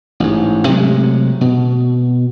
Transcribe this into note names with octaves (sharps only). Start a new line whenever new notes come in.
A1 G#2
C3 F#3 G#3 A3
B2